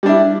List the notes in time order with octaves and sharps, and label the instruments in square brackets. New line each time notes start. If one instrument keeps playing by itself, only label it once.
[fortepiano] G3
D4
E4